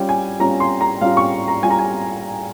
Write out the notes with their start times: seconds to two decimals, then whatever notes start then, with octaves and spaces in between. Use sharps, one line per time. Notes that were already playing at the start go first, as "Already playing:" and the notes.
Already playing: G3 C#4 F4 G5
0.09 G#5
0.40 G3 C#4 F4 A#5
0.60 C6
0.81 A#5
1.01 G3 C#4 F4 F5
1.17 C#6
1.48 A#5
1.63 G3 C#4 F4 G#5
1.70 A#5
1.79 G#5